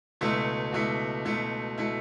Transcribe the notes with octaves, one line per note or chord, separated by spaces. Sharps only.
C#2 B2 A3 E4
C#2 B2 A3 E4
C#2 B2 A3 E4
B2 A3 E4